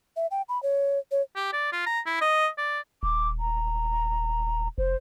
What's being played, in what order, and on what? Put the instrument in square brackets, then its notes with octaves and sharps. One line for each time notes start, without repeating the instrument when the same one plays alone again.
[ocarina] E5
G5
B5
C#5
C#5
[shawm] G4
D5
F4
A#5
E4
D#5
D5
[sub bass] D#1 [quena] D6
[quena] A#5
[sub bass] F1 [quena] C5